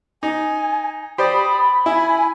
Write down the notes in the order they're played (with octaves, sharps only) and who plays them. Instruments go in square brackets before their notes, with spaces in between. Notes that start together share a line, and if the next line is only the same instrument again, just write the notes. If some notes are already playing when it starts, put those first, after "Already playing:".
[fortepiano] D#4 [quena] G#5
[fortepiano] G4 C5 D5 [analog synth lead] B5 [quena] D#6
[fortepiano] E4 [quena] G#5